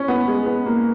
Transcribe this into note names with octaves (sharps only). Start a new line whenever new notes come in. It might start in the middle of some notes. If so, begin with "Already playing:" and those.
Already playing: C#4
B3
G#3
B3
A#3